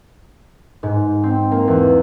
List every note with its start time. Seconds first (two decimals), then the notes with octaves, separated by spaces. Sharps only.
0.83 G#2
1.23 C4
1.51 A#3
1.68 E2